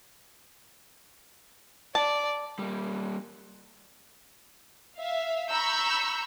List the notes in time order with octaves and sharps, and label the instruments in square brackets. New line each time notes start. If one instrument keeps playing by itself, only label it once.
[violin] D5 [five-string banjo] A5
[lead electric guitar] G3 A#3
[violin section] E5 F5
A#5 B5 C#6 E6 G6